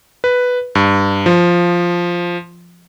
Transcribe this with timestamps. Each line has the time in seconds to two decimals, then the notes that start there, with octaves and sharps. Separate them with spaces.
0.24 B4
0.75 G2
1.26 F3